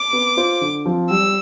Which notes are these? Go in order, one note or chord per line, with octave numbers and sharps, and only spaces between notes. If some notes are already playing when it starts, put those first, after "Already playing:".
Already playing: D6
B3
F4 C5
D3
F3 C4 F4
G3 E6